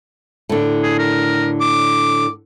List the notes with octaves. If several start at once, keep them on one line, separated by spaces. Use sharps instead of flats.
A2 D3
G#4
A#4
D6